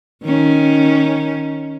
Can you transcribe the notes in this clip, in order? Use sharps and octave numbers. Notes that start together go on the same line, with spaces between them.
D#3 C#4